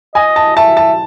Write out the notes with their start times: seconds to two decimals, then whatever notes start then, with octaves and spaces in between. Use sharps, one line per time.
0.15 D#5 G#5
0.36 A5
0.56 E5 A5
0.77 A5